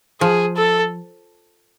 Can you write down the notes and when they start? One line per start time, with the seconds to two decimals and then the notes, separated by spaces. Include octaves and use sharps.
0.21 F3 G#4
0.56 A4